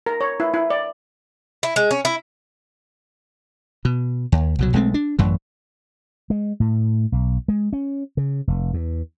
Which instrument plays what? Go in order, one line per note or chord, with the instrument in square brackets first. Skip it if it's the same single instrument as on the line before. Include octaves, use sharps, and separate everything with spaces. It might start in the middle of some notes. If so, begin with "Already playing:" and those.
[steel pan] A#4
C#5
E4
E4
D5
[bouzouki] E4
G#3
C#4
E4
[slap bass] B2
D#2
C2 B2 F#3
B1 G#3 A3 C4
D4
A1 F#2 E3
G#3
A2
B1
G#3
C#4
C#3
F1
E2